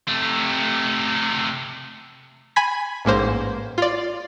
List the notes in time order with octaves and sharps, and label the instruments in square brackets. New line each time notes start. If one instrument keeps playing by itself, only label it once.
[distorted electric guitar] C3 A3
[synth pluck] G#5 B5 G#6 B6
A1 G#2 A#3 C5
F4 D5